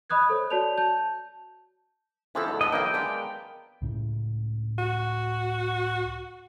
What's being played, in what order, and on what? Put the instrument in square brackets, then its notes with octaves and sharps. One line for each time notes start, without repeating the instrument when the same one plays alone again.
[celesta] D#5 B5 D#6 F#6 G#6
A4 C5 C#5
F#4 C#5 D5 A5 G6 F7
A5 G6
[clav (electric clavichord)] E3 F3 C4 [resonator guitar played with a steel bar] B3 E4 A4
[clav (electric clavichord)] D2 G#2
[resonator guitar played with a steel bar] A2 B4 A5 [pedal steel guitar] D#5
[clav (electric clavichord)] B1 A#3 [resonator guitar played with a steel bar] E3 E4 [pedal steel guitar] G5
[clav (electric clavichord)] G#3 D4 [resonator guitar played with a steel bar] A#3 B3
[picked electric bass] C#2 A2 C#3
[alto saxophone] F#4